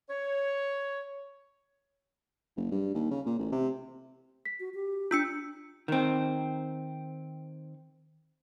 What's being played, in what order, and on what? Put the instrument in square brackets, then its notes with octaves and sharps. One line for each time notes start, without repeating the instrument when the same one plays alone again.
[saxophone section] C#5
[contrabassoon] F#1
G2
D#2
C#3
A#2
A1
C3
[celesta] B6
[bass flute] F#4
G4
[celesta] D4 G6 [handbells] F4 E6 C#7
[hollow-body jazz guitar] D#3 C4